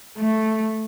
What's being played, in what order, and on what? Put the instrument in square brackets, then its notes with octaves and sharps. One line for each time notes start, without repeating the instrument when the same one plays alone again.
[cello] A3